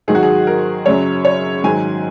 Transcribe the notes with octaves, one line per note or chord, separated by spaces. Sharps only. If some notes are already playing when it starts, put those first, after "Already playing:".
G#2 D#3 F#3 G#4
F#4
G#4
A#4
F#2 C#3 F#3 C#5
C#5
G#2 D#3 F#3 G#5